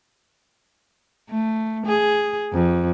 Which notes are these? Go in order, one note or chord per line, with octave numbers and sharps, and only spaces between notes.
A3
G#4
F2